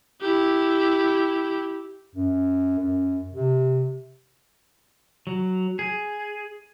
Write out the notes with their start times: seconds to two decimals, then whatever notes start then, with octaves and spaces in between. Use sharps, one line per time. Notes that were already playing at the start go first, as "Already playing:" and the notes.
0.21 E4 G4
2.15 F#2
2.79 F#2
3.34 C3
5.27 F#3
5.79 G#4